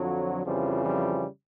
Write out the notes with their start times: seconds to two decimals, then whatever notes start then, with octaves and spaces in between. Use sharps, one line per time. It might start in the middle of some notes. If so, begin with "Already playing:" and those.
Already playing: F2 D3 F3 F#3
0.44 F2 C#3 E3 F3 G3
0.85 F3 G3